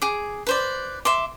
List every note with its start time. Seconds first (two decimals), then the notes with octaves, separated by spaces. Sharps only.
0.02 G#4 D6
0.47 B4 C5 D5
1.05 E5 C6 D6